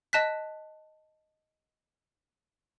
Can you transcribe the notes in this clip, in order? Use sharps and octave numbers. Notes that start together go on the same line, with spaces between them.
D#5 A5 F#6 B6